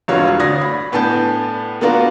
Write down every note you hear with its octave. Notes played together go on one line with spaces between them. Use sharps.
E1 G2 F4 F#4 C#5
D2 D5 D#6 G#6 A#6
B5
A2 B3 D4 G#5 A5 G6
A#3 B3 D4 F4 F#4 A#4